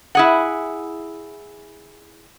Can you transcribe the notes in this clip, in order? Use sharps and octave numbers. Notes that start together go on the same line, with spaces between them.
E4 G#4 F#5